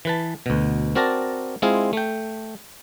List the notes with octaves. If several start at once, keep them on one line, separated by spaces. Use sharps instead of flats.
E3 B4 A5
D2 B2
C4 F#4 A#4 D5 A5 A#5
G#3 C4 E4 F4 G#4
A3 G5